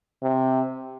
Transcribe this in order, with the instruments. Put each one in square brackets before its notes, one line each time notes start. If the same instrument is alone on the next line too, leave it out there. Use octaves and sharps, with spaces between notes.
[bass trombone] C3